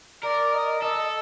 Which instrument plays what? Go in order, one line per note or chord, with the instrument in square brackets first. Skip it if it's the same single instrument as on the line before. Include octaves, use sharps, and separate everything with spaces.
[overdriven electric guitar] A#4 [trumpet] D5
[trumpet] D#5
[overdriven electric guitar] A4 [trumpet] D#5